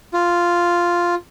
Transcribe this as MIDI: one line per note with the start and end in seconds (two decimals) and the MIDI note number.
0.14 1.15 65